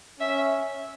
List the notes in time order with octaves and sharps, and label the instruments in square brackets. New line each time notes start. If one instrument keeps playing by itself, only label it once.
[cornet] C#4 [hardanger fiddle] E5